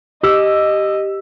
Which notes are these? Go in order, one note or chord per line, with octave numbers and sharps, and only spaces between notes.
G4 D#5 E6